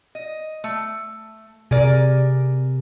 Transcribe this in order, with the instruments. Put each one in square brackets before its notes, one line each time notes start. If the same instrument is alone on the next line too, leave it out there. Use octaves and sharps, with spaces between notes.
[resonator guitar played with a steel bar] D#5
A3
[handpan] C3 [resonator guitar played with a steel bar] G#4 A#4 D5